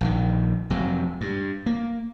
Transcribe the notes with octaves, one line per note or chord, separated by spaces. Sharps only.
A#1 D3 D#3
F1 C3 F#3
G2
A#3